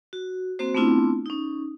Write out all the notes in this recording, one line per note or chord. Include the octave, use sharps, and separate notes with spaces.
F#4
A#3 C4 F#4 C5
A3 B3 C4 D4 E4 F4
C#4 D#4